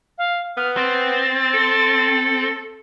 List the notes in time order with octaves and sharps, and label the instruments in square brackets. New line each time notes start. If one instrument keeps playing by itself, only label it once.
[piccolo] F5
[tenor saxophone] B3 [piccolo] F6
[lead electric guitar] C4 [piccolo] A6
[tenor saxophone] A4